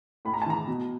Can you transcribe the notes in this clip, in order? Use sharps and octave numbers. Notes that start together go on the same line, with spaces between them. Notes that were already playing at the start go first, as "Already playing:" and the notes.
A2 B5
A#5
A5
E3 A#5
B2